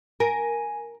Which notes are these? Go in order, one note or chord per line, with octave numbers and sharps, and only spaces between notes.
A#4 G#5